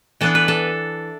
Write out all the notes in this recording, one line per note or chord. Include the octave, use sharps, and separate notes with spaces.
E3 B3 D4 A4
B4
A4